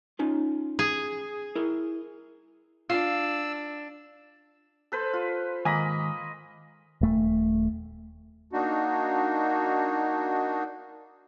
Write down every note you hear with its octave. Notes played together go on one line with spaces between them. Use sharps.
C#4 D#4 F4
G#4
E4 A#4
D4 F4 F5 E6
A4 B4 C5
F4
G#2 D#3 A#3 D#5 G#5 B5
D#1 A3
A#3 D4 D#4 F#4